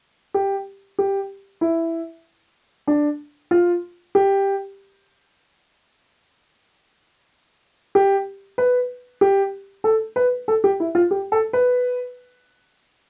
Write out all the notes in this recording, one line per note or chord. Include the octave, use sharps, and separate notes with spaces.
G4
G4
E4
D4
F4
G4
G4
B4
G4
A4
B4
A4
G4
E4
F4
G4
A4
B4